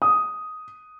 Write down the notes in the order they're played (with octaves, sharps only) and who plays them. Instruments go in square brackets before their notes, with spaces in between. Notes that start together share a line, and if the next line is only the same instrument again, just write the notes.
[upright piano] D#6